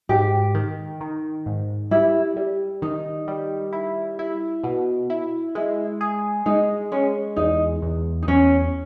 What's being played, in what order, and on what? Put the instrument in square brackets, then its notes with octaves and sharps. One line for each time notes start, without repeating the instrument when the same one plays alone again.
[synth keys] G#2 [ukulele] G4
[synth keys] D#3
D#3
G#2
[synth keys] G3 [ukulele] E4
[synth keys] G3
[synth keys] D#3 [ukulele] D#4
[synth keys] G3
E4
E4
B2
E4
[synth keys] G#3 [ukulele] E4
[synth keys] G#4
[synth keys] G#3 [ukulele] D#4
[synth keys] G#3 [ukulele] C#4
[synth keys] E2 [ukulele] D#4
[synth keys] E2
[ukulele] D#4
[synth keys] E2 [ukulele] C#4